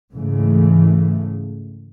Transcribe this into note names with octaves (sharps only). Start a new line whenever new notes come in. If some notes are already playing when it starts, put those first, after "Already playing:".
G#2 C#3 E3 A3